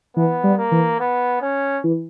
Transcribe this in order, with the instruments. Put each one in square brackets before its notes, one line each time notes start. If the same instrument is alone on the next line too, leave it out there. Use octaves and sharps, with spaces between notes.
[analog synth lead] E3 [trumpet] B3
[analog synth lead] G3
[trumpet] A#3
[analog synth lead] E3
[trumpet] B3
C#4
[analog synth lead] E3